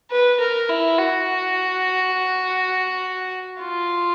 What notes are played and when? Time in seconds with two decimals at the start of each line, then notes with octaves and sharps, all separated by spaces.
0.11 B4
0.40 A#4
0.69 E4
0.99 F#4
3.62 F4